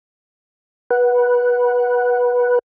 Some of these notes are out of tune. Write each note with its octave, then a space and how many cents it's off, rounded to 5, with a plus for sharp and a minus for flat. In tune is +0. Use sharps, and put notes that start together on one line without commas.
B4 -20 F#5 +0